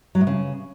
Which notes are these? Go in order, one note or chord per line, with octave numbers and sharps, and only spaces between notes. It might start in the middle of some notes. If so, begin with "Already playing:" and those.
F#3
A2
C#3